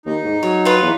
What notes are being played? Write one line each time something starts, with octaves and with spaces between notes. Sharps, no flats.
D#2 D#4
G#2
F#3 C#5
F4 B4 C#5
E2 D#4